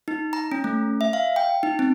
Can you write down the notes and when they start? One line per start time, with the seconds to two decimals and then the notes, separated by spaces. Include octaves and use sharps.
0.08 D#4
0.33 A#5
0.51 C#4
0.64 A3
1.01 E5
1.13 F5
1.36 G5
1.63 D#4
1.79 C4